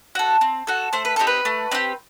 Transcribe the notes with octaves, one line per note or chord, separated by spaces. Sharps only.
F#4 A4
C4
F#4 A4
A3 C5
B4
C4 D#4 G4 A4
B4
A3
C4 D#4 G4